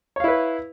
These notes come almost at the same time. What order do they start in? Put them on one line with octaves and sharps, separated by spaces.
C#5 F5 E4 B4